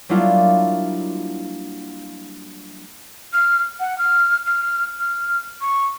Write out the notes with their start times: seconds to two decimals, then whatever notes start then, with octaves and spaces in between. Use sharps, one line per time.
0.09 F#3 G3 A#3 D4 E4 F4
3.33 F6
3.80 F#5
3.98 F6
4.46 F6
5.00 F6
5.61 C#6